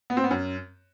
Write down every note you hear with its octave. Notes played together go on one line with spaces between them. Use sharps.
B3
C4
B3
F#2